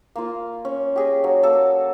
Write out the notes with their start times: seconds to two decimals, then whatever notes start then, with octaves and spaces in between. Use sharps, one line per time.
0.16 A#3 F4
0.65 C#4
0.96 G4 G#4 D#5
1.24 F#3
1.43 A#3 A4 A5